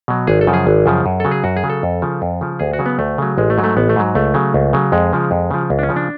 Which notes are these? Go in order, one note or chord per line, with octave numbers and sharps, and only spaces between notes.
B2 F#3
G#1 G#4
A4
F#2 C#3 F3
G#4
G#1
F#2 C#3 F3
F#2
C#3 F#3 A4
G#4
F#2 F#4
G#4
C#3 F#3
A4
F2
C#3 F3
F2
C#3 F3
D2 G#4
F#4
C#3 F#3
B3
D2 A3
C#3 F#3
A1 G#3
A3
G#2 F#3
A3
A1 B3
A3
G#2 F#3
C#2 A3
C#3 F#3
C#2
C#3 F#3
F2 G#3
C#3 F3
F2
C#3 F3
C#2
D4
C#4
C#3 F3
D4